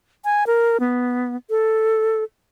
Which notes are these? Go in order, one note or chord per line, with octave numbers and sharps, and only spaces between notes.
G#5
A#4
B3
A4